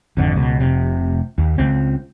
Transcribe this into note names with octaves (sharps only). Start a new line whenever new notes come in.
G#1 F2 D3
C#2 B2
F1 C3
D#2
C#2 C4